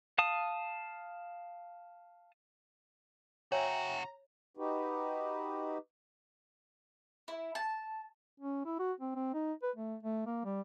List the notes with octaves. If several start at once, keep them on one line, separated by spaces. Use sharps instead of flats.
F5 A5 D#6
C#3 F#4 C#5 E5 G5 G#5 A#5
D#4 F#4 G4 B4
E4
A5
C#4
E4
F#4
C4
C4
D#4
B4
A3
A3
A#3
G3